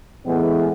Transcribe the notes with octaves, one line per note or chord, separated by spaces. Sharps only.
A2 E3 G#3 B3